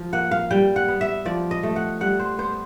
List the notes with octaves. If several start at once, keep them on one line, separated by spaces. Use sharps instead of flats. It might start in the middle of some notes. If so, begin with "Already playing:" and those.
Already playing: F3
A#3 F#5
F5
G3 G5
F#5
B3
E5
F3 D5
D#5
A3
F#5
G3 F#5
C5
B3 C5